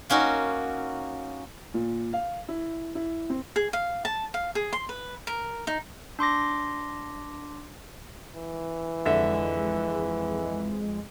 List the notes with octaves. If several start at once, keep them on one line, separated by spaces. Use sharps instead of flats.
A#3 C#4 D#4 F#4
A#2
F5
E4
E4
C4
G#4
F5
A5
F5
G#4
C6
B4
A#4
D#4
D4 C6 D6 A#6
E3
F2 D3 G#3 E5